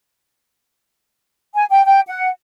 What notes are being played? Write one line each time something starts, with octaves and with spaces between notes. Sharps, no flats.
G#5
G5
G5
F#5